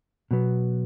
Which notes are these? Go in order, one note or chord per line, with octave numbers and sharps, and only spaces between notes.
B2 F#3 B3